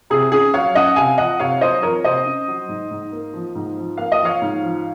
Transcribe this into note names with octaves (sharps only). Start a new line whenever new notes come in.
C3 G#4
C#4 G#4
F#3 C#5 F5
C#4 D#5 F#5
C3 F5 G#5
F2 D#5 F#5
C3 C#5 F5
F#3 C5 D#5
F2 A#4 C#5
C3 C5 D#5
C#4
F#3
G#2
G#2
A#3
F3
G#2
F3
A#3 F5
D#5
F3
C#5 F5
G#2
F3